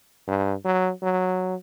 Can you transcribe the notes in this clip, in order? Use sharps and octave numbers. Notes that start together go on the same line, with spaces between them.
G2
F#3
F#3